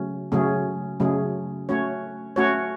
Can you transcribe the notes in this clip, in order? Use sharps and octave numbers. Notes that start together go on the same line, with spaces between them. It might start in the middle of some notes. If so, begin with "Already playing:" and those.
Already playing: C#3 F#3 A3 C#4
C#3 F#3 A3 C#4 G#4
C#3 F#3 A3 C#4 G#4
A3 C#4 F#4 C#5
A3 C#4 F#4 C#5